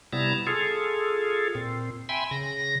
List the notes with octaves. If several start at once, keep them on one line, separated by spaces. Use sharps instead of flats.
C3 G3 B3 E4 A5 A#5
F4 G#4 A4
A#2 C4
E5 G5 G#5 B5 C6
C#3 A#6